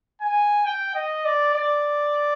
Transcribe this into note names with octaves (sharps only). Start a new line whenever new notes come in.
G#5
G5
D#5
D5
D5